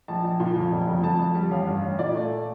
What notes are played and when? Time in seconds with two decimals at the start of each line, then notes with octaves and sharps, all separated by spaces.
0.08 A#1 A5
0.24 A#1
0.40 A#2
0.56 F2
0.72 F1
0.88 F2
1.03 F2 A5
1.19 F2
1.35 G3
1.51 A1 F5
1.67 G2
1.83 A1
1.99 A#2 D5
2.14 A3